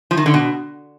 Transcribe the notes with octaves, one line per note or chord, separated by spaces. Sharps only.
F3
D#3
D3
B2